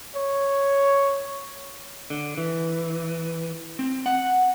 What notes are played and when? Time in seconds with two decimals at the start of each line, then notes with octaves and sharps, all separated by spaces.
0.16 C#5
2.10 D3
2.38 E3
3.79 C4
4.06 F#5